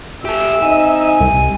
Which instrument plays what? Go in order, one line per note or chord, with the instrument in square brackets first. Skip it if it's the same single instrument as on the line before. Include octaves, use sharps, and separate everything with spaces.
[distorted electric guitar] G4 A4 [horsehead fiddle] E5
[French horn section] C4 D#4 D#5 [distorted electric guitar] G#5
[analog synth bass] C2